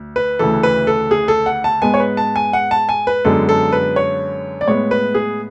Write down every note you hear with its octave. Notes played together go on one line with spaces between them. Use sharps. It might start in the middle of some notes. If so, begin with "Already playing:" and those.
Already playing: D2
B4
D2 C#3 E3 A4
B4
A4
G#4
A4
F#5
A5
G#2 G#3 B3 G#5
C#5
B4
A5
G#5
F#5
A5
G#5
B4
F#2 D3 G#3 B3 A4
A4
B4
C#5
D5
A2 G#3 B3 C#5
B4
G#4